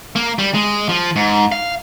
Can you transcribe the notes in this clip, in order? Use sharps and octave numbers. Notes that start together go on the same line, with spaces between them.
A#3
G3
G#3
F3
G#2
F5